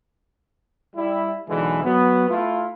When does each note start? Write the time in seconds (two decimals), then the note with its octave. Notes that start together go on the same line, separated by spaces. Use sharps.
0.95 G3 E4
1.48 B1 D3 E3 G#3 E4
1.83 F#3 B3
2.28 A3 E4 F4